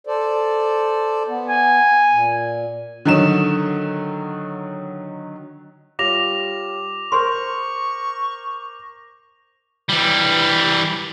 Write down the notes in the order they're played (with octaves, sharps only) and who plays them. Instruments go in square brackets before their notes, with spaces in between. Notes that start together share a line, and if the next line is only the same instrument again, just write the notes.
[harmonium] A4 C5 D5
B3
[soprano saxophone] G#5
[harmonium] A#2
[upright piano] D3 D#3 F#3 D#4 E7
[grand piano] G3 F4 C#5 [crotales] D6 A#6 F7
[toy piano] G#4 C6 [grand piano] A#4 C5 F6 [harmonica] C#6
[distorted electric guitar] E3 G3